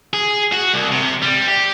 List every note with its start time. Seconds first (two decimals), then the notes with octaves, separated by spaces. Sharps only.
0.13 G#4
0.53 F#4
0.74 C2
0.92 C3
1.22 G3
1.48 G4